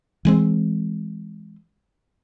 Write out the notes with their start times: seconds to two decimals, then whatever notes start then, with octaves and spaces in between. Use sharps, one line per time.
0.25 E3 G#3 C4